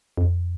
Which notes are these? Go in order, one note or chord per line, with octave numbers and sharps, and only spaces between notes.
F2